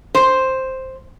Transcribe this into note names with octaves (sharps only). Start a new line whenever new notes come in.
C5